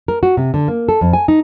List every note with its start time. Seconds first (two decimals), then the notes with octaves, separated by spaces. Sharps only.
0.08 A#4
0.23 F#4
0.37 C3
0.54 D3
0.68 A#3
0.89 A4
1.01 F2
1.13 G#5
1.28 D#4